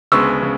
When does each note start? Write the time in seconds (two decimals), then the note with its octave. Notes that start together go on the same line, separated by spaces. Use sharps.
0.12 D2 C#3 G#3 B3 C#6 E6
0.42 C#3